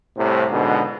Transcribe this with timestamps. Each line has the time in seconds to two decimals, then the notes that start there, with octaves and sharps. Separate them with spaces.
0.17 C2 A2 C3
0.51 C#2 G#2 B2 D3